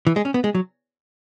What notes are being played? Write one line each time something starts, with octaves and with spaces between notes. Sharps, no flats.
E3
G#3
C#4
B3
G#3
F#3